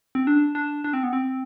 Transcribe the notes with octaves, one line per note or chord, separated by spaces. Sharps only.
C4
D4
D4
D4
C4
B3
C4